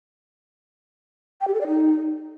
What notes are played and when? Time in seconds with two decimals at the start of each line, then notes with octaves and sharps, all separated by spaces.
1.41 G5
1.47 G4
1.54 A4
1.61 D5
1.67 D#4